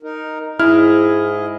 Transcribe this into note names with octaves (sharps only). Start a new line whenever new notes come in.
D#4 A#4
G#2 E4 G#4 D#5 F6